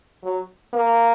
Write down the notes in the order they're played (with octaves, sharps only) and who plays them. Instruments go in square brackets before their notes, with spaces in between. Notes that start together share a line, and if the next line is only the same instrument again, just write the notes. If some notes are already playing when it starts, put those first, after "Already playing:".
[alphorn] F#3
A#3